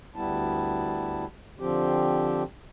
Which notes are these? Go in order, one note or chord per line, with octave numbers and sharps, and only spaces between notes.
D2 G3 B3 E4 A5
D3 F3 C4 G4